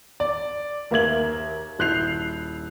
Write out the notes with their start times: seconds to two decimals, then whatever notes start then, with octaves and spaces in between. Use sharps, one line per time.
0.20 D5
0.91 D#2 A#3 E5 G#6 F#7
1.79 D#1 E4 F#6 G6 C7 F7